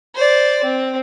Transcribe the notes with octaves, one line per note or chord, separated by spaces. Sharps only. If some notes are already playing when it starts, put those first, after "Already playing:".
C5 D5
C4